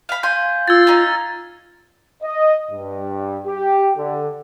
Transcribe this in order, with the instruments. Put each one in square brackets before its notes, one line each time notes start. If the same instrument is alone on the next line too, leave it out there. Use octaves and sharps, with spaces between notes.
[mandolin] F5 B5
[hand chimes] F5 C6 G6 [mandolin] G#5
[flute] F4 [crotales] E6 G#6 A6
[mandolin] C#4 D#4
[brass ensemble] D#5
G2
G4
D3